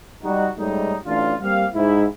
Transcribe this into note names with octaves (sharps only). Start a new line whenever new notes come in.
G3 D#4 F#4
G#2 G3 A3 C#4 D#4
A1 D4 F4
G3 A#3 C4 G4 F5
G#2 E4